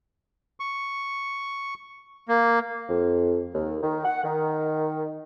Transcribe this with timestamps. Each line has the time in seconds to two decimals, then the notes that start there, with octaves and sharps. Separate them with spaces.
0.60 C#6
2.28 A#3
2.89 F2
3.53 D#2
3.83 D#3
4.05 F#5
4.24 D#3